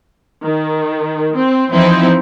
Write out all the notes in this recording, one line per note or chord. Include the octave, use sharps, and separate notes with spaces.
D#3
C4
E3 F3 C4 D#4 E4